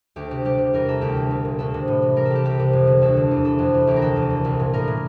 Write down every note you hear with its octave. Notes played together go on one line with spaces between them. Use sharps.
D2 G4
C3 G4
G3 G4
C3
E2 A#4
E3 A4
D2 G4
D3
C2
A#2
D2 A4
C3
A2
E3
G3 A#4
A4
G3 G4
C2 G4
C3
F2
D3
D2 A4
D3
E2
C3 A4
F2
E3
D2 G4
A#4
D3 A4
E2
D3
C2
A#2
A2 A#4
E3